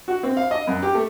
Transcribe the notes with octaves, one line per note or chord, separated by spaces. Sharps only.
F#4
C4
F5
D#5
F#2
G4
A3